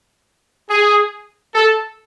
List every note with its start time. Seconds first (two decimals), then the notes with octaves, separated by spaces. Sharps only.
0.69 G#4
1.54 A4